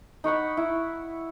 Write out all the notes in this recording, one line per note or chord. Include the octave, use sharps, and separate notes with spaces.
D#4 C#5 F#5 B5
E4